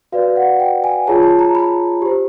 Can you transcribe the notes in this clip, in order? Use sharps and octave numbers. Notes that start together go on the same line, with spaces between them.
F#4 B4 D5 F5
F#5
G5
G#5
F4 G#4 C#5 A5
A5
A#5
B5
G4 C5